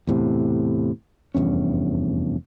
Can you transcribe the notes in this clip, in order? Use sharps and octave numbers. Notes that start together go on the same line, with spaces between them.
E2 A2 C3
F1 E2 G2 C#4